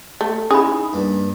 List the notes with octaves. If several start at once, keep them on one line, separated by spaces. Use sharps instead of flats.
A3
C#4 D#4 E4 G#4 B5 D#6
G2 A#3 D4